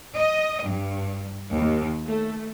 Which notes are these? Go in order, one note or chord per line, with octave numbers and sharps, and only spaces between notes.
D#5
G2
D#2
A3